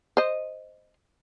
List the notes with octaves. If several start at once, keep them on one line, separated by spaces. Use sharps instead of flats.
C5 D#5